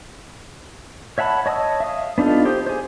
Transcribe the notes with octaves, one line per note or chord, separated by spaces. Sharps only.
C#5 E5 F#5 A5 B5
C#5 D#5 A5 D#6 E6
E5 F5 D#6
B3 D4 D#4 F4 A4
G4 C5 D#6
G#4 C5